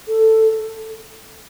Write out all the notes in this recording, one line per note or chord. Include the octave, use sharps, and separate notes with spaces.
A4